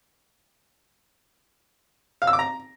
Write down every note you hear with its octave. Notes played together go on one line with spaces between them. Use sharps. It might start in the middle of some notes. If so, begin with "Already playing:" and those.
F5
E6
D6
A#5